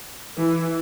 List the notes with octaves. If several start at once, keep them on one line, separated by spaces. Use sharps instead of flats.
E3